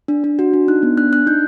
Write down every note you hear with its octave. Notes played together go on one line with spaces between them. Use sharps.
D4
D4
F#4
D4
D#4 F#6
B3
D4 F#6
D4 F#6
D#4 G6